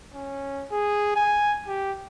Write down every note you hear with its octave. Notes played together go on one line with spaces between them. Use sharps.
C#4
G#4
G#5
G4